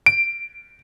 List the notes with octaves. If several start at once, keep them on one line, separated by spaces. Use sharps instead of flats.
D7